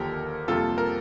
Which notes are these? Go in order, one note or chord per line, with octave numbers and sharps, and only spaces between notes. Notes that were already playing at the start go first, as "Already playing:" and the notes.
Already playing: D#2 D3 F3 A#3 G4 A#4
F2 C3 G3 A#3 F4 A4
A#4